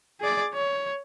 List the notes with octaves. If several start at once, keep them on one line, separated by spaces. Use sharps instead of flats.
G#4 D5
C#5